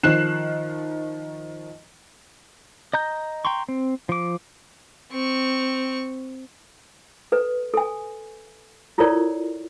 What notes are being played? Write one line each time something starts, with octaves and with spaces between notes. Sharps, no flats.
D#3 F3 F#6 C7 E7
D#5 A#5 G6
G5 A#5 C6 C#6
C4
F3 D6
C4 C#6
A4 B4
A4 G#5
E4 F4 A4 A#4 C#5 D5